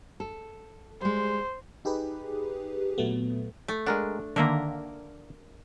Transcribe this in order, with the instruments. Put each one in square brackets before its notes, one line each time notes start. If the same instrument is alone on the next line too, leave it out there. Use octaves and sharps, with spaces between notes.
[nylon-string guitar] A4
[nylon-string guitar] G3 G#3 [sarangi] C5
[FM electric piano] D#4 G4 G#4 B4
A#2 F#3 A3 B3
[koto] A3
[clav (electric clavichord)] G#3 A#4 F#5 [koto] D4
[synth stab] D3 D#3 A#3 [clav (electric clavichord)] D4 E5 A#5 [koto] A#4